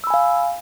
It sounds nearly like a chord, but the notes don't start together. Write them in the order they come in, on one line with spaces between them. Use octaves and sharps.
E6 B5 G#5 F5